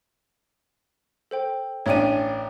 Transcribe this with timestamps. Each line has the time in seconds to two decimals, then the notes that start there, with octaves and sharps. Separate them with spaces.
1.31 A4 C5 G5
1.86 A1 C#4 D4 C#5 G5 D#7